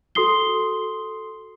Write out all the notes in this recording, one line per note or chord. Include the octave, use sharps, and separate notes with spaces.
F#4 A4 C6 D#6 C7 G7